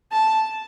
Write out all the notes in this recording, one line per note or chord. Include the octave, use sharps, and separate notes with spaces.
A5